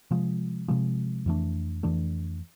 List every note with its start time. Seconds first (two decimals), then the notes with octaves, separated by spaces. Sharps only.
0.11 C3 F3 G#3
0.68 C3 F3 G#3
1.26 F2 E3 A3 D4
1.83 F2 E3 A3 D4